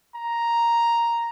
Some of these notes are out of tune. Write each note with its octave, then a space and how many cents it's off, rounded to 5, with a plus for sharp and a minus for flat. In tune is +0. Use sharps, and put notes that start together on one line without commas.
A#5 +0